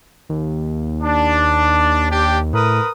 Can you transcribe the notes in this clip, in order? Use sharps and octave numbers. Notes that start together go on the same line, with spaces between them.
D#2
D4
D4 G4
A2 A#4 B4 D#6